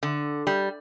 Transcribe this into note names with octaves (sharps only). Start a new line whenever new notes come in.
D3
G3